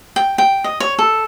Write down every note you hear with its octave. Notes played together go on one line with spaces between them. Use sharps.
G5
G5
D#5
C#5
A4